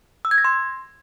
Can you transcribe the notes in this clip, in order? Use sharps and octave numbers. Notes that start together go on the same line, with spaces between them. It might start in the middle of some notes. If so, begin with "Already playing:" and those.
E6
G#6
A#6
C6